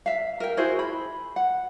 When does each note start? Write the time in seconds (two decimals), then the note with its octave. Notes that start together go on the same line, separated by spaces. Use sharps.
0.06 E5 F5
0.40 A#4 G5
0.57 E4 F#4 G#4 C5
0.79 B5
1.36 F#5